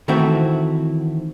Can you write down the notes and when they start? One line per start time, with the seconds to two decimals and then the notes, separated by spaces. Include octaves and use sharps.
0.08 D#3 E3 A3 C4 E4 F#4